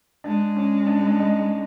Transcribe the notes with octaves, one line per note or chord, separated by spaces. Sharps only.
G#3 D4
C#4
D4
D4
D#4